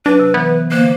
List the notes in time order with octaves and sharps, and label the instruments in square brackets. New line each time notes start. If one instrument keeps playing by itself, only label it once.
[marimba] F#3 [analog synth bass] D4 [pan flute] B4
[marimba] C3
[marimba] E3 [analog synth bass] B3
[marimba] D3 C5 [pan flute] A#3